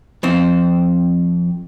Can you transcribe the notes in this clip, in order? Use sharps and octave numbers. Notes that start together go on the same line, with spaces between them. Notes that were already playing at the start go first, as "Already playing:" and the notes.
F2 C4